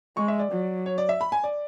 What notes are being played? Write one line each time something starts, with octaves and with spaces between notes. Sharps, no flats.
G#3 C#6
E5
D5
F#3
C#5
D5
E5
B5
G#5
D5